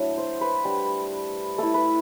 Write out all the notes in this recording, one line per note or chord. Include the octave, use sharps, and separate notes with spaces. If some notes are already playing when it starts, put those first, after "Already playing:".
Already playing: F#3 A3 D4 E4
C5
B4
G3 D4
A3 E4 A4
B4